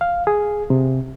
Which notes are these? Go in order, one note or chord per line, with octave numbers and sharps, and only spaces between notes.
F5
G#4
C3